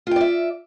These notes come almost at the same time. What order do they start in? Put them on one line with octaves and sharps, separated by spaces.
F4 G5 D5 E5